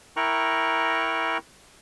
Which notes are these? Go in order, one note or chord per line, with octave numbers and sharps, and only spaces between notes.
E4 A#4 G5 A#5 C#6 F#6